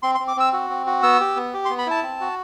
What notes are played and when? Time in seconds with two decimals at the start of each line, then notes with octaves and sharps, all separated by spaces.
0.03 C4 C6
0.15 C6
0.20 C4
0.28 D6
0.37 C4 E6
0.53 F#4
0.70 C4
0.86 F#4
1.03 B3 E6
1.20 G4
1.36 B3
1.54 G4
1.65 C6
1.70 B3
1.79 B5
1.86 E4 A5
2.03 C4
2.21 F#4